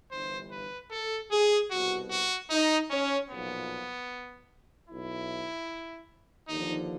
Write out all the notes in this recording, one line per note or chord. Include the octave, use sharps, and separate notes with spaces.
G1 G2 E3 C5
B4
A4
G#4
C2 B2 F#4
F#4
D#4
C#4
B1 A#2 F3 B3
B1 B2 E4
D#2 D3 F3 D#4